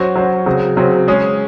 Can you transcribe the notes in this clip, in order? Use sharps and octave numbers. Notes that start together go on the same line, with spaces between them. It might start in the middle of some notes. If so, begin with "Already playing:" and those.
Already playing: F#3 C#4 F#4 C5
F#3 C#4 F#4 C5
C#3 F#3 C4
C#3 F#3 C4
G#3 C#4 G#4